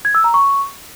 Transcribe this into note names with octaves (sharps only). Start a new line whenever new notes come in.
G#6
E6
A#5
C#6